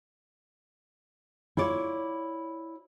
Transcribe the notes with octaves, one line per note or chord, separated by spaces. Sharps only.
E4 F4 C#5 D5